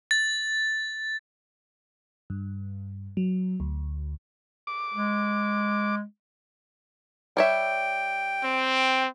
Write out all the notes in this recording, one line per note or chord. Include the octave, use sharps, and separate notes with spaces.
A6
G2
F#3
D2
D6
G#3
G3 C#5 E5 G5
C4